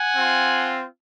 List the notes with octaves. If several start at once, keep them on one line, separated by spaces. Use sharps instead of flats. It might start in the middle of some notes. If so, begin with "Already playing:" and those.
Already playing: F#5 G#5
C4 F4